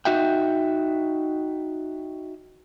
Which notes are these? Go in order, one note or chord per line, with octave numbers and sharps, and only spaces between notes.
D#4 F#4 E5 G5